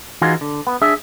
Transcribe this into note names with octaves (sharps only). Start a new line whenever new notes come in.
E3 D#4 F4 F#4 G#4
D3
B3
D4 G#4 E5